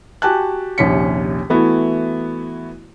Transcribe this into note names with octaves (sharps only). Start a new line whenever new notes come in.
F#4 G4 G#5 A5 F#6
A#1 D#2 C3 C#4 B6 C#7
E3 A3 B3 E4 F#4